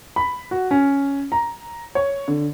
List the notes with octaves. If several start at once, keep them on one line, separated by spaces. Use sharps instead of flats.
B5
F#4
C#4
A#5
C#5
D3